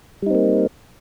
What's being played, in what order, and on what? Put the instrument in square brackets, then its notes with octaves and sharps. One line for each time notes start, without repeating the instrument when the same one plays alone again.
[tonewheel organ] G3
D#4
C4
A#3